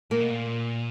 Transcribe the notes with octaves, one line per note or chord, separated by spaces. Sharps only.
A#2 A#3
B2
A#2